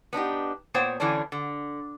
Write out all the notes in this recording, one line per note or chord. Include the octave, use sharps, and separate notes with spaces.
B3 D4 D#4 G4
A#2 B3 C5 C#5 G5
D3 E3 A3 C#4 D4
D3